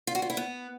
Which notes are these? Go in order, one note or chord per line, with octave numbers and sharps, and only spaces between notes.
F4
F#4
F4
E4
B3